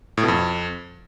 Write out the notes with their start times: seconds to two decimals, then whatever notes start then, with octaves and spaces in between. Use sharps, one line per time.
0.17 A2
0.23 B2
0.28 F2